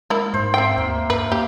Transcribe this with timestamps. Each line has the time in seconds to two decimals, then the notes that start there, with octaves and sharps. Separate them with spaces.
0.10 G#3 A#3 E4
0.34 G#2 C5
0.54 C4 E5 G5 C6
0.77 D#2 A#3
1.10 G2 B4
1.32 A#3 G4